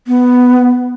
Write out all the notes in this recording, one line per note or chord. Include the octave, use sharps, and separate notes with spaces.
B3